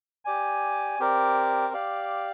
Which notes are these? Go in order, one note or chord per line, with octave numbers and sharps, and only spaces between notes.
G4 D5 G#5
C4 G4 A#4 D5
G4 D5 F5